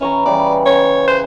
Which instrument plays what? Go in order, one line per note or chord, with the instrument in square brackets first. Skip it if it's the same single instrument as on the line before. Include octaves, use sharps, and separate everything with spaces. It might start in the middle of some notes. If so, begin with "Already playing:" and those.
[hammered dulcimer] E3 C#5 A#5 [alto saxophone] C#4
[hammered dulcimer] C#3 E3 G3 [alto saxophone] D5
[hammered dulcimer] C#3 [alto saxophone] C#5
[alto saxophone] C5